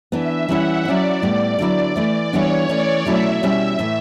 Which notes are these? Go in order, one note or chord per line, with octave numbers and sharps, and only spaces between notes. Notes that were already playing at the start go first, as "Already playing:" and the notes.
E3 B3 D4 E5
E3 G3 C#4 E4 F#5
F#3 C#4 E4 D5
A2 G3 B3
D3 F#3 B3 E4
E3 A3 E4
E3 G3 B3 D4 C#5
E3 A3 C#4 D5
B2 F#3 A3 C#4 E4 E5
B2 G3 C#4 E4 E5
A2 E3 A3